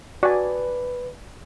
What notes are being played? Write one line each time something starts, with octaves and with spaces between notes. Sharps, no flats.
F#4 B4 D5 G#5